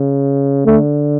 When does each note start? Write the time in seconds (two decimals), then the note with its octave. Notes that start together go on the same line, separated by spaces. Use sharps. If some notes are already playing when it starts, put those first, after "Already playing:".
Already playing: C#3
0.66 D3 A3